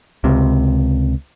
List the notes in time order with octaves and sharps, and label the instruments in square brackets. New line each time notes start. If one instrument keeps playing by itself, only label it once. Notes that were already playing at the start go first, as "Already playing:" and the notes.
[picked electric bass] C#2 C3